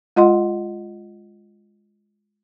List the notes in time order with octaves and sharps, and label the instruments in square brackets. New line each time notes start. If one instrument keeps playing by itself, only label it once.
[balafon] G#3 F4 D#5 F#5 C6